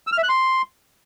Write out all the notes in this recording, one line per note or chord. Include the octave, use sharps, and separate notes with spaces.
E6
F6
E5
F#6
C6